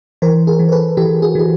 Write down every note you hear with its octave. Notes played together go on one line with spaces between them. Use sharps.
E3 A#4 C5
G#4 A#4
E3
A#4
A4 B4
E3 G4 A4
F#4 G#4
E3 G#4